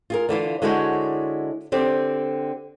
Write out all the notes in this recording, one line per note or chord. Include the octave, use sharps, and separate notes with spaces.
F4 G#4 A#4
D3 E3 E4 F4
D3 G#3 E4 F#4 C5 C#5
D3 C4 G4